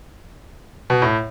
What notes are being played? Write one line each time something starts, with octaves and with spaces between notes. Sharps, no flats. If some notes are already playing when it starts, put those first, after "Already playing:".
B2
A2